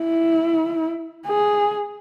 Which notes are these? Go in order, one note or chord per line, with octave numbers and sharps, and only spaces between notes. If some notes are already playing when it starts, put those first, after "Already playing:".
Already playing: E4
G#4